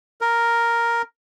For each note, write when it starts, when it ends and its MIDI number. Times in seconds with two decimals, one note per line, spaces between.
0.21 1.02 70